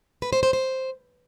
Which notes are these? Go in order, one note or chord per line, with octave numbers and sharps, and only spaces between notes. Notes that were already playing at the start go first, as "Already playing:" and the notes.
B4
C5
C5
C5